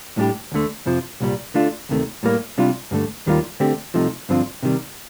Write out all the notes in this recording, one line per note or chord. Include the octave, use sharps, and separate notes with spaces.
A2 G3 D4 G4
D2 D3 A3
F2 C3 F3
C2 A#2 G3
D3 A3 D4 F4
D2 C3 D#3 A3
A2 G3 A#3
C3 G3 D4 F4
G2 D3 A3
D#2 D#3 G3 A#3 F4
D3 A3 C4 G4
C2 C3 F3 A3 D#4
G2 D3 F3 C4 F4
C3 D#3 G3